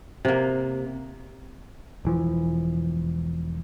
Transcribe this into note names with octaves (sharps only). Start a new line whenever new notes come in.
C3 A#3
E1 E3 F3